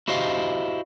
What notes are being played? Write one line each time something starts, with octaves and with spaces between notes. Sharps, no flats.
E4 F#4 G4 C5 D#5 F5